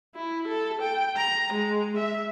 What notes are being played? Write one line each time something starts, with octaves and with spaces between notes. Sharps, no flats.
E4
A4
G5
A#5
G#3
E5